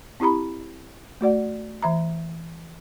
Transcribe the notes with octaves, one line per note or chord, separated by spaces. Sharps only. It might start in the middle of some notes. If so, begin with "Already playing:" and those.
C4 E4 G4 A#5 B5
A3 F#4 D5 F#5
E3 E5 A#5